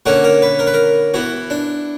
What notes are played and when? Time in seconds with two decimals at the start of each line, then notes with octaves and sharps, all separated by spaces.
0.06 D3 A#3 C#4 F#4
0.24 A#4
0.42 B4
0.59 A#4
0.67 B4
0.74 A#4
1.14 E3 B3 F#4
1.50 D4